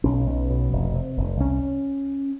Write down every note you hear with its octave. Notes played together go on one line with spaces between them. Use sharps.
B1 C#4
B1
B2
F1
C3
F1
C2 C#4